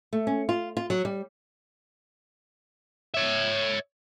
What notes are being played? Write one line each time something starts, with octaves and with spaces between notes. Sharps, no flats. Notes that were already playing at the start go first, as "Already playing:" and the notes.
A3
C#4
F4
F4
F#3
G3
C#5 E5